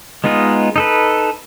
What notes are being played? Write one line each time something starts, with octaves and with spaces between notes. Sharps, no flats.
G#3 B3 D#4 F4 G#4
D#4 A4 B4